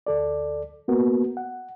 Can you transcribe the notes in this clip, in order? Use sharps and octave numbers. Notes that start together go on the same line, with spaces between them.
D2 A4 D5
A#3 B3 F#4 A#4
F#5